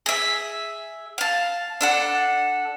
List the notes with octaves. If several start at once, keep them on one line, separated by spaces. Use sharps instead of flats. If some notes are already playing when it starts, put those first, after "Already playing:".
G#4 E5
F5 A5
D4 A4 F#5